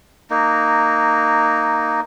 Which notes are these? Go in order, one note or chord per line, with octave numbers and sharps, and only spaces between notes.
A#3 D#4